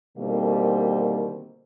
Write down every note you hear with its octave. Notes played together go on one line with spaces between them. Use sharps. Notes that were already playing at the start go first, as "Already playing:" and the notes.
B2 D3 D#3 G3 A#3 C4